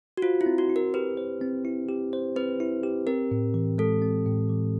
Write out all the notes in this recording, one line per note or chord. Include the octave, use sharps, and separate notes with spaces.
F#4
F4 C5
E4
C4
F#4
E4
A#4
G4 B4
C5
C4
E4
G4
C5
C4 B4
E4
G4
C4 A#4
A2
E3
G#3 A4
C4
A2
E3